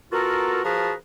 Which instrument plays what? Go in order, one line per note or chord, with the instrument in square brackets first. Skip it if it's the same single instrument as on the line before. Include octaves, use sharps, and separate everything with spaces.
[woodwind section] B3 F4 F#4 A4 A#4
F3 F#4 G#4 A#4 B4 A5